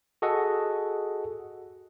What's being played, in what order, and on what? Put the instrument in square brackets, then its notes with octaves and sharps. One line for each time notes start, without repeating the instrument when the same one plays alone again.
[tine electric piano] F#4 G#4 A4 D#5 F#5